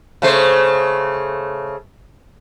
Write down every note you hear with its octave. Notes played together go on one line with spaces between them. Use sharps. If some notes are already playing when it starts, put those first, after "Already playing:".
C#3 A3 C5